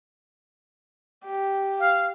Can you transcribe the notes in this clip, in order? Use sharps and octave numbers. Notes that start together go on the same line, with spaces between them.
G4
F5